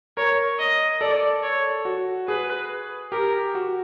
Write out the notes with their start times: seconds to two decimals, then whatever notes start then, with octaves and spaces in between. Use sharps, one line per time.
0.17 A#4 C#5
0.59 D#5
1.01 A4 D5
1.43 C#5
1.85 F#4
2.28 G#4 B4
3.12 G4 A#4
3.55 F#4